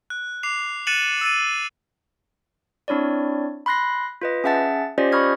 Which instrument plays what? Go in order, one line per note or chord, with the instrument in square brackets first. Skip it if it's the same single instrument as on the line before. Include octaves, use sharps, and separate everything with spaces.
[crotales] F#6
D6 C7 F7
F#6 A6 C#7 D#7 E7 F#7
E6 A6 D#7
[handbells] C4 D4 E4 C#5 D5
B5 C6 F#6 A#6 C7
F4 B4 D#5
C#4 G#4 E5 F#5 A5 A6
C#4 F4 G4 C5 D5 D#5
B5 C#6 D#6 F6 G#6